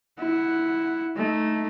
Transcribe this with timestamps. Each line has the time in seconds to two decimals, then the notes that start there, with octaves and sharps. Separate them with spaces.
0.19 E4 F#5
1.17 A3 D#4